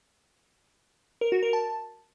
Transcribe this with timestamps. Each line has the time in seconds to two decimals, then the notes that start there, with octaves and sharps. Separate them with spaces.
1.21 A#4
1.32 F#4
1.43 A#4
1.53 A5